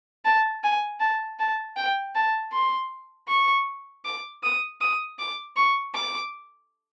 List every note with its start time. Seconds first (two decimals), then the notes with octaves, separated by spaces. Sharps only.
0.25 A5
0.63 G#5
1.00 A5
1.39 A5
1.76 G5
2.15 A5
2.52 C6
3.28 C#6
4.05 D6
4.43 D#6
4.81 D#6
5.19 D6
5.56 C#6
5.95 D6